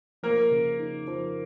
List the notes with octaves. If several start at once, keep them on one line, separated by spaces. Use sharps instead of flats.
F3 A#3 A#4
C#3
D#4
F3